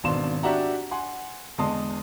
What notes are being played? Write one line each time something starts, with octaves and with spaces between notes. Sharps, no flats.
G#1 B2 D4 F5 C6 E7
D4 F#4 G4 E5 F#5 A#5
F#5 G#5 C6
E2 D3 G#3 A5 C6 D#6